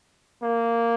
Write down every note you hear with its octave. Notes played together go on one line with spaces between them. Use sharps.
A#3